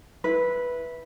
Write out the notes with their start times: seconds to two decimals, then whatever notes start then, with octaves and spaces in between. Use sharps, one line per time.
0.24 E4 B4